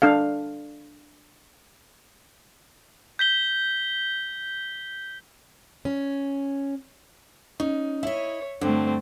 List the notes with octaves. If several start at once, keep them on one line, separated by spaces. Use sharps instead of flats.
D4 A4 F5
G6 B6 G7
C#4
C#4 D#4
E4 C#5 D#5 E5
G2 D3 A3 C4